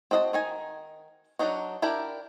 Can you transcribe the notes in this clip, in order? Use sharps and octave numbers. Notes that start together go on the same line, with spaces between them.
C4 F#4 D#5 F5 A5
D#3 D#4 G#5
F#3 A#3 D4 D#4 F#4
D4 E4 G4 A#4 A#5